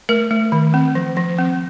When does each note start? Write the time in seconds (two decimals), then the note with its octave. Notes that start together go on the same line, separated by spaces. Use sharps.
0.09 A3 A#4
0.31 A3
0.52 D#3
0.74 C4
0.95 F3
1.17 F3
1.38 C4